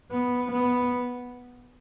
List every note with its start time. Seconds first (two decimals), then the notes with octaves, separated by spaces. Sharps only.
0.11 B3
0.52 B3